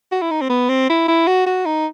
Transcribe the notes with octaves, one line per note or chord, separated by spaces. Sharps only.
F#4
E4
D#4
C4
B3
C4
E4
E4
F#4
F#4
D#4